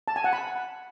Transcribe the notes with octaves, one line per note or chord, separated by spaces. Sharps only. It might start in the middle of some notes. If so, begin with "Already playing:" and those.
A5
G#5
F#5
B5